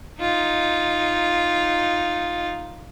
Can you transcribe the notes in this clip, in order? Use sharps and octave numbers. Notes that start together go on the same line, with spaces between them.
D#4 F4